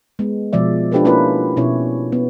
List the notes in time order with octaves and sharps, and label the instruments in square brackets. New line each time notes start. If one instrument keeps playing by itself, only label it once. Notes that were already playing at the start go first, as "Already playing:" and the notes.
[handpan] G#3 B3
B2 F3 G#3 D5 E5
D4 F4 G4 A4 B4 C5
A#3 C#4 E4 F4 A#4 B4
B2 C#4 E4 C#5
B3